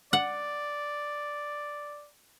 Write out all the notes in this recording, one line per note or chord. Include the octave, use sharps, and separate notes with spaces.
D5 F#5